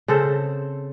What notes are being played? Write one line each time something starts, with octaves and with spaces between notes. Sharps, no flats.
C#3 C4 A4 C5